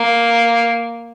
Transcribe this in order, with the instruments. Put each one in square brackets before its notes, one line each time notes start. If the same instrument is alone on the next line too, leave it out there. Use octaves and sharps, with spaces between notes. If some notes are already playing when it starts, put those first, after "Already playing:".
Already playing: [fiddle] A#3